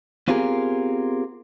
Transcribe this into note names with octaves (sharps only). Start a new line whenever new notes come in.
B3 C4 F4 G4 G#4 A#4